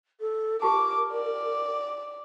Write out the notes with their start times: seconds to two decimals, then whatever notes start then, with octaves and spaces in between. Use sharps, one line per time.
0.20 A4
0.62 F4 G4 A#4 A5 D6
1.13 D5